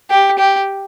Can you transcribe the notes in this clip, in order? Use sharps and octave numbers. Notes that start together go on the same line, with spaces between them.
G4
G4